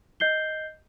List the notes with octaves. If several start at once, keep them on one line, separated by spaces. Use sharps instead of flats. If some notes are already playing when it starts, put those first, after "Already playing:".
D#5 G6 C7 G7